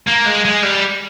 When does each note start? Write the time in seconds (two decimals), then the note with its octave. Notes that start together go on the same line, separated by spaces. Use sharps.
0.07 A#3
0.25 G#3
0.45 G#3
0.63 G3